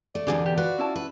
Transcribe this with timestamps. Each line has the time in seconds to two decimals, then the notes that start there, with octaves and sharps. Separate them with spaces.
0.15 A3 D5
0.27 E2 B2 D3 D4 G4 G#4
0.46 G4
0.57 F4 F#4 B4
0.78 C#4 E4 A5
0.96 B4